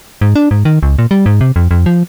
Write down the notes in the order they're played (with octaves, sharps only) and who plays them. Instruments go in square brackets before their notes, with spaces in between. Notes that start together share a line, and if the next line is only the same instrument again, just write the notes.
[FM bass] G#2
D4
G#2
D#3
C#2
A#2
G3
G#2
C3
F2
F2
F3